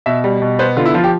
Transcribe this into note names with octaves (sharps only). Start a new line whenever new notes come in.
B2 E5
G3
B2
B3 C5
D3 F4
E4
F3 F4
G4